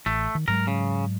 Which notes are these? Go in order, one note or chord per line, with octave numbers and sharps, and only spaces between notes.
A1 A3
D#3
G#2 F#3 G#3 A#4
C#3